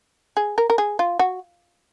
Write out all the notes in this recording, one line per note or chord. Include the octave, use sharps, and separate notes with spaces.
G#4
A#4
A#4
G#4
F4
F#4